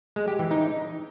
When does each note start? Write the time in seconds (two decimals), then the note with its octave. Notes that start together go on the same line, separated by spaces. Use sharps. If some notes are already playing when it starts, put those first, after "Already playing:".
0.16 G#3
0.28 G4
0.39 E3
0.51 D#4